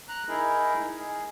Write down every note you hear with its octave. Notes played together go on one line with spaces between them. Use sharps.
A#5 F#6
D#4 E4 G#4 A#4
G#4